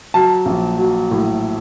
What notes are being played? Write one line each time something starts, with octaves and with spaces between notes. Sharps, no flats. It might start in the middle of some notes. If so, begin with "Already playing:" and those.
F#3 A5
A#1
F#3
A2